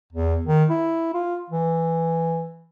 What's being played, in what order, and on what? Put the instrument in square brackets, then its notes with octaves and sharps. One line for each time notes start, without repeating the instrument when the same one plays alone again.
[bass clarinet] E2
D#3
E4
F4
E3